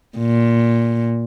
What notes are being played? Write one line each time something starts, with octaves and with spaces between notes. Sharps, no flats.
A#2